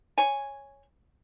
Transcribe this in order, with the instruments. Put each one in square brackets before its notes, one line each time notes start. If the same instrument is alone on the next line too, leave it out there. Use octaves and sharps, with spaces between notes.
[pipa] C#5 G#5